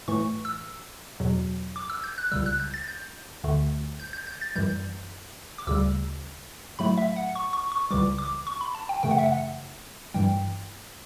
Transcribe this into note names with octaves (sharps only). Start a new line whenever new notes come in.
A2 E3 A3 C#6
E6
E2 B2 F#3
D6
E6
G6
F#6
C#2 C#3 G3 E6
F#6
G6
A6
G6
D2 D3 A3
G6
G6
G6
A6
F#2 E3 G3 G6
D6
D2 C#3 G3 E6
A2 F#3 A3 B5
E5
F#5
C#6
C#6
C#6
C#2 C#3 E3 G3 D6
D6
C#6
B5
A5
G5
F#2 C#3 E3 A3 G5
F#5
E5
F#5
G2 E3 G3 G5